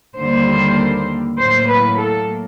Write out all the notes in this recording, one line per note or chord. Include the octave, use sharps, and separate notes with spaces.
D#2 D3 G3 A#3 C5
A2 F#3 A#3 C5
B4
A4